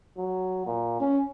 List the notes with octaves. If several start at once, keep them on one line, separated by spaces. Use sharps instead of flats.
F#3
A#2
C#4